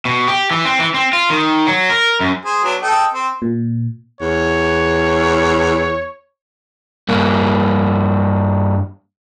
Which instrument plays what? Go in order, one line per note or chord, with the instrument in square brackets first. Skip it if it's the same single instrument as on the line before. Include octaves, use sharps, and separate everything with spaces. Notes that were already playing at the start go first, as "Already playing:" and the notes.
[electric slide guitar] B2
G4
E3
C4
E3
C4
F4
D#3
F#3
A#4
F#2
[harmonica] G#4 C5
F#3 B3 D4
A4 D#5 G5
C4
[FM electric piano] A#2
[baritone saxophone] E2 [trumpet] C#5
[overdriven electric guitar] G2 A#3